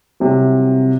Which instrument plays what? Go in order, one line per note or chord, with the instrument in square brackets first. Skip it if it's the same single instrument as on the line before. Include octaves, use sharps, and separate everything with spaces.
[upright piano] C2 C3 F#3